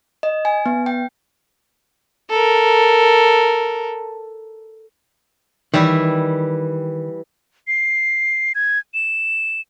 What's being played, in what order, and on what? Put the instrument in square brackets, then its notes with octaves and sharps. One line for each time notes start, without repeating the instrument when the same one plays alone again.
[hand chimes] D#5
G#5
B3
G5
[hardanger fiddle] A4 A#4
[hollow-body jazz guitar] D#3 [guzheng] E3 G3 E4
[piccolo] C7
G#6
E7